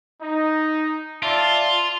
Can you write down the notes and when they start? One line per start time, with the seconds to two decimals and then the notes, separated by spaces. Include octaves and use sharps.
0.21 D#4
1.23 F4 D5 E5 A5